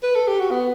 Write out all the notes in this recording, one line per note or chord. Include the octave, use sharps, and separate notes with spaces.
B4
A4
G4
F#4
B3